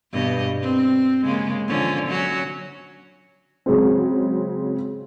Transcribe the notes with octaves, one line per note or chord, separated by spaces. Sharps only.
G2 B2 D#5
C4
C#3 G#3 A#3
D3 F3 C#4
F#3 C#4 F#4
C#3 F#3 G#3 C4